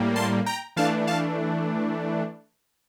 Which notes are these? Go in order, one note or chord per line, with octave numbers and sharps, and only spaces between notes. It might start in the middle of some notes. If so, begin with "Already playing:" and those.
Already playing: A2 G3 A#3
A5 C6
G5 A#5
E3 A3 D4 F5 A5
F5 A5